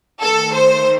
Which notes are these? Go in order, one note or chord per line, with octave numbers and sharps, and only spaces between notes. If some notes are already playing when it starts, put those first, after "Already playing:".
D#3 A3 A4
C5